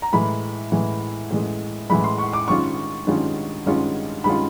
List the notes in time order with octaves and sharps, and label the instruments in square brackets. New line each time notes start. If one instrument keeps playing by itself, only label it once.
[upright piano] A#5
A2 E3 G#3 B5
A2 E3 G#3
A2 E3 G#3
A2 E3 G#3 B5
C6
C#6
D6
G2 D#3 G#3 C#4 F4 C#6
G2 D#3 G#3 C#4 F4
G2 D#3 G#3 C#4 F4
G2 D#3 G#3 C#4 F4 B5